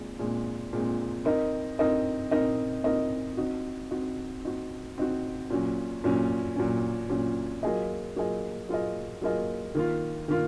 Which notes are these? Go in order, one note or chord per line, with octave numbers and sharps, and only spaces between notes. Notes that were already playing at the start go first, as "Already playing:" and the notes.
Already playing: A#2 G#3 C4
A#2 G#3 C4
A#2 G#3 C4
C4 D#4 A#4 D#5
C4 D#4 A#4 D#5
C4 D#4 A#4 D#5
C4 D#4 A#4 D#5
C4 D#4 F#4
C4 D#4 F#4
C4 D#4 F#4
C4 D#4 F#4
A#2 F#3 C#4
A#2 F#3 C#4
A#2 F#3 C#4
A#2 F#3 C#4
F#3 A#3 F4 G#4 D#5
F#3 A#3 F4 G#4 D#5
F#3 A#3 F4 G#4 D#5
F#3 A#3 F4 G#4 D#5
D#3 A#3 F4
D#3 A#3 F4